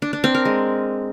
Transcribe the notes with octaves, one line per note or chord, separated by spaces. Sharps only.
D4
D4
C4
A#4
G#3